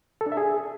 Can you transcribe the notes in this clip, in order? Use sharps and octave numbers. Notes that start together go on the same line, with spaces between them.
A4
D4
E5
G#4